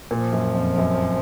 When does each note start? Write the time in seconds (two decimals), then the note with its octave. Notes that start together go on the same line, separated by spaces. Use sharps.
0.11 A#2 F3
0.33 F#2
0.55 F2
0.78 F#2